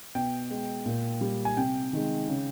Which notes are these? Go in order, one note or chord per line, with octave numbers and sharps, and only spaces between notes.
B2 G5
G#3
A#2
G3
G#5
C3 G5
D#3 G#3
C#3